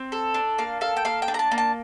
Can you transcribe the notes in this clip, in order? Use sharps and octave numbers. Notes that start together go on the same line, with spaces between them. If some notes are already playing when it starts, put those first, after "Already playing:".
Already playing: C4
A4
D4
A#3 F5
A4 F5
G5
A#3 F5
G5
D4
A#5
A5
A#3
A5